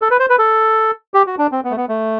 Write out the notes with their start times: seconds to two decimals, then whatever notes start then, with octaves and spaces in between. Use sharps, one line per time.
0.02 A4
0.10 B4
0.19 C5
0.29 B4
0.39 A4
1.14 G4
1.27 F#4
1.38 D4
1.52 C4
1.64 B3
1.71 A3
1.77 B3
1.89 A3